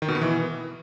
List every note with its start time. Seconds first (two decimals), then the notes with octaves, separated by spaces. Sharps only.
0.02 D#3
0.08 B2
0.15 B3
0.21 E3